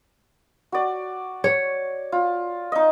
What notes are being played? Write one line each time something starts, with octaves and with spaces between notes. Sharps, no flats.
F#4 D5
C#5
F4
D#4 D#5